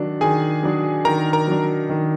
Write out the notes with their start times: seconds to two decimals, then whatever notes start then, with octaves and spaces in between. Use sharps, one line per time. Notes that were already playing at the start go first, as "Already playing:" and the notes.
Already playing: D#3 F#3 D4
0.21 D#3 G#4 G#5
0.63 F#3 D4
1.05 D#3 A#4 A#5
1.33 A#4 A#5
1.47 F#3 D4
1.89 D#3